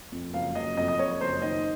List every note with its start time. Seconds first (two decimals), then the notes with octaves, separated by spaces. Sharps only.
0.12 F2
0.33 F#1 F5
0.55 F#1 D#5
0.77 F2 D#5
0.88 D#5
0.98 F2 C#5
1.20 F#1 C5
1.41 D#3 D#5